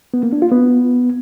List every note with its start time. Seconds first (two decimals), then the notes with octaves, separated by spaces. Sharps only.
0.14 B3
0.23 A#3
0.33 D4
0.42 F4
0.52 B3